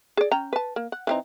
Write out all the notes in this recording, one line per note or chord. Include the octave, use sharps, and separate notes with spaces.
G#4 D5
C#4 G5 A#5
B4 A5
A#3
F#5
E3 C4 D#4